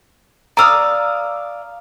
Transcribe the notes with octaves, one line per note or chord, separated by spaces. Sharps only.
D5 F5 A#5 D#6 E6